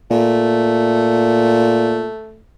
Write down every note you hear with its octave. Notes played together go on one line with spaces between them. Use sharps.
A#2 A3